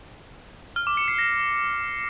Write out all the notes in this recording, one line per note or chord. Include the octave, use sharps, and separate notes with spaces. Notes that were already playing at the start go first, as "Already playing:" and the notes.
F6
D6
C#7
C7
A#6